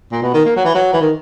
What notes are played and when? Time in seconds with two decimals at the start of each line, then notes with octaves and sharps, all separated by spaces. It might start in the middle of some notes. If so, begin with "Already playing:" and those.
0.12 A#2
0.22 B2
0.34 D#3
0.45 A#3
0.56 F#3
0.65 E3
0.75 F#3
0.93 E3
1.01 D#3